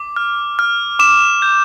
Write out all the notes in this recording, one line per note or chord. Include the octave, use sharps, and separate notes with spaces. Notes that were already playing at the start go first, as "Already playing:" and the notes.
Already playing: D6
F6
F6
D6 E7
G6